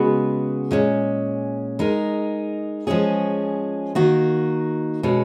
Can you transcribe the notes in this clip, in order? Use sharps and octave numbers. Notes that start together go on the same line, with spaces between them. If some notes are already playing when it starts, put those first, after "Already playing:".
Already playing: C#3 G#3 B3 F#4 B4
A#2 G#3 C#4
G#3 D#4 A#4
F3 G#3 C#4 G#4
D#3 A#3 D#4 F#4
B2 G#3 C#4